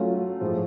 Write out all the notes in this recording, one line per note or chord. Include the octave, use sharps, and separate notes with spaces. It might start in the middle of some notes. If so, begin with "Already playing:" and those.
Already playing: F#3 A3 C#4 F4
A2 F3 G#3